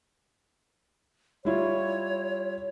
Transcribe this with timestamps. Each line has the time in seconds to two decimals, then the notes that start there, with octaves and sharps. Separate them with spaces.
1.45 G3 E4 F4 C#5